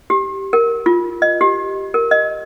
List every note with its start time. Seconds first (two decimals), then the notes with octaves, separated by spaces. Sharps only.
0.10 G4
0.53 A#4
0.86 F4
1.22 D#5
1.41 G4
1.94 A#4
2.11 D#5